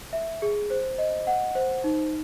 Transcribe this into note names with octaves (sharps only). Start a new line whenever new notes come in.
E5
G#4
C5
D#5
F#5
C5
D#4